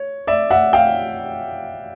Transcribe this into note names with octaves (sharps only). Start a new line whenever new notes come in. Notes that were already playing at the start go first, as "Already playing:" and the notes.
Already playing: C#5
D5 E5
E5 F#5
F5 G5